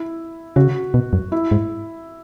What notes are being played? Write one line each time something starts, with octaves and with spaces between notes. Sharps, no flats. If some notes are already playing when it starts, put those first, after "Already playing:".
Already playing: E4
C#3 F#4
B2
F#2
E4
G#2